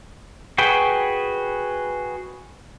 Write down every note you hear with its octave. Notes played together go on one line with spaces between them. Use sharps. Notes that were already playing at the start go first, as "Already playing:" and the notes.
F#4 G#4 B4 G5